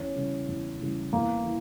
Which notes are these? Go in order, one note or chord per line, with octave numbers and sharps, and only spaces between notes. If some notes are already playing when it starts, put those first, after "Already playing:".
Already playing: E2 C#4
C#3 E3 G3
E2
C#3 E3 G3
E2 A#3
E3